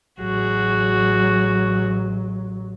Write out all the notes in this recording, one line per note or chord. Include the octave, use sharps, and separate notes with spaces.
A1 F#3 F#4 G#4